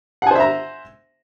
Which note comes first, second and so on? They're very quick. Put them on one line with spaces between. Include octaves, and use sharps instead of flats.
F#5 G#5 C5 E5 A#5